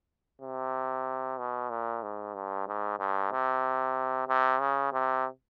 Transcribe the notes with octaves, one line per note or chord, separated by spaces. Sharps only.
C3
B2
A#2
G#2
G2
G#2
G2
C3
C3
C#3
C3